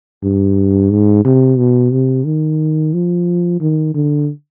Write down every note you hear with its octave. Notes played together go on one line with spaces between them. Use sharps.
G2
G#2
C3
B2
C3
D#3
F3
D#3
D3